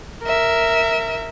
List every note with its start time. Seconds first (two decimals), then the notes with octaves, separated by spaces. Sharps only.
0.23 A#4 E5